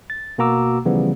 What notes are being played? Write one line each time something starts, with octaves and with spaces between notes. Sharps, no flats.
A6
B2 A#3 F#4 A#5 D6 E6
C#3 E3 F3 G3 B3